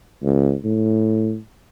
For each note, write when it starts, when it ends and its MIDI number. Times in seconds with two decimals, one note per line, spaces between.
0.23 0.55 37
0.64 1.37 45